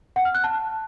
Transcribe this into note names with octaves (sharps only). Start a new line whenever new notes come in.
F#5
F6
F#6
A5